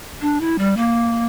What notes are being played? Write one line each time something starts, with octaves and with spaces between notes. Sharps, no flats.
D4
E4
G3
A#3